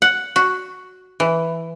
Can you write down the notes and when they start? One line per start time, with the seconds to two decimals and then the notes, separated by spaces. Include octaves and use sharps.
0.02 F#5
0.36 F#4
1.20 E3